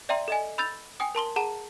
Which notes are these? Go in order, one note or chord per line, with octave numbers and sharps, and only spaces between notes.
D5 E5 G5 A#5 C6
A4 D#5 G#5
B5 E6 G6 A6 F7
G5 G#5 D#6
A#4 A5 C6 G7
G#4 F#5 A5 A#5 E7